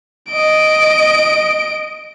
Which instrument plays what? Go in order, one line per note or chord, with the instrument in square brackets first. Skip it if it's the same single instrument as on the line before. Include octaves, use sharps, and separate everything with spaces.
[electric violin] D#5 D7